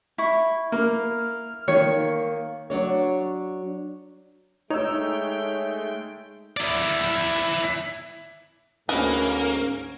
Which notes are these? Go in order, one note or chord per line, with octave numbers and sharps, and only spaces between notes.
E4 C#6
A#3 F6
D#3 A#3 C#5
F#3 D4 C#5
G#3 A3 D#4 C#5 G5 E6
E4 D5
D2 G#2 A#3 C#4 G#4 A4 B4